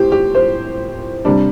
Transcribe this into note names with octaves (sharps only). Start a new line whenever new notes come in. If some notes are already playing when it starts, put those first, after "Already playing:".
Already playing: A2 G4 C5
G4
C5
C3 G3 D4